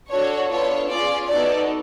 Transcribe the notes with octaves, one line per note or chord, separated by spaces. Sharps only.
D4 F#4 A4 C#5
B3 D4 F4 A4 C#5
C#4 F4 G#4 D5
B3 D#4 F#4 A4 D5